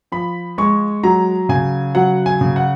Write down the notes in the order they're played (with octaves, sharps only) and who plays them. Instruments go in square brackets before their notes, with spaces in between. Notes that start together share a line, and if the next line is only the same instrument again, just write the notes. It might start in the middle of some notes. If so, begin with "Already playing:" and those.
[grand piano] F3 B5
G#3 C#6
F#3 A#5
C#3 G#5
F#3 F#5
G#5
C#3
F#5